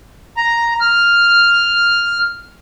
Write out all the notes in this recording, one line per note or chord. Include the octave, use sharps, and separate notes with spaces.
A#5
F6